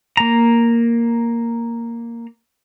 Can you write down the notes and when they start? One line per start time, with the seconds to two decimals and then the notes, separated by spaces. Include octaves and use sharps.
0.17 A#3 A#5